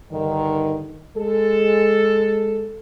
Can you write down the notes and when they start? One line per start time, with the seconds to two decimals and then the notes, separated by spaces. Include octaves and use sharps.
0.11 G2 D3 D#3
1.17 G#3 A4